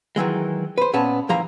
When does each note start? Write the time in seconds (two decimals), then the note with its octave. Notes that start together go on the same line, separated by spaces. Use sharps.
0.16 D#3 E3 F#3 G#3
0.78 B4 C5
0.93 A#2 B3 C#4 C#5 A5
1.29 D#2 E3 F3 A#3 F5 A#5